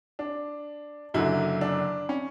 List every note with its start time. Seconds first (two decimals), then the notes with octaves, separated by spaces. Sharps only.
0.19 D4
1.14 F#1 F#2 D3 F#3 E4
1.61 D4
2.09 C#4